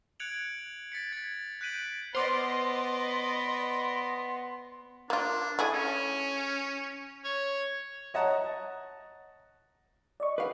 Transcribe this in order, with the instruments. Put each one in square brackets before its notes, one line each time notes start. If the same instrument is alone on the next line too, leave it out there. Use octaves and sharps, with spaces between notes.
[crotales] F#6 G#6 C#7 D7 F7 F#7
A6 B6 C#7
G#6 A6
F#6 G6 B6 D7 D#7 F#7
[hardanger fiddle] B3 [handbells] C5 D6 [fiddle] D5 D#5 [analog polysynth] C6
[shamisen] A#3 F4 [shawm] D4
[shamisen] A3 E4 G#4 [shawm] G#5
[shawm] C#4
C#5
[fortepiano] C#5 D#5 F#5 A5 A#5
[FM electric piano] D5 D#5 C#6
[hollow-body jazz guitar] B4 F5